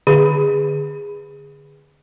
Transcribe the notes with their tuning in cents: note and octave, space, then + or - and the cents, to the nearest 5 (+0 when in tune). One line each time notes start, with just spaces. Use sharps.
D3 +0 G#4 -15